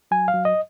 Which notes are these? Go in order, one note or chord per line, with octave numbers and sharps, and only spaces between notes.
F#3 G#5
F5
F#3
D#5